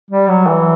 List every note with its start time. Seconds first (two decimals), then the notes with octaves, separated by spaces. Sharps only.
0.11 G3
0.28 F#3
0.47 E3